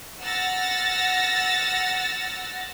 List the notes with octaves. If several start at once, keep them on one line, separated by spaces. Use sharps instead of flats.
F#5 E6 F6 A6 A#6